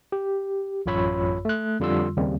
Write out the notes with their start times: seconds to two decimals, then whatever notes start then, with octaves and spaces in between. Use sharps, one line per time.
0.12 G4
0.86 A1 F#2 F4 C#5 B5 E6
1.45 A3 F#6
1.80 F2 D3 G3 F4 C6 E6
2.17 D#2 C#3 G3 A#3 C4